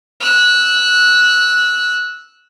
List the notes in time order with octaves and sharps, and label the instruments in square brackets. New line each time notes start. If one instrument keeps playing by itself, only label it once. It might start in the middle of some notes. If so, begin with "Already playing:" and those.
[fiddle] E6 F#6